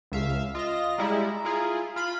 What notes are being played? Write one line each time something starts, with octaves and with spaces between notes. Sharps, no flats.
C#2 E5 F5
F4 D#5 A#6
G3 G#3 E4 A#5
E4 F4 G#4
F4 F5 B5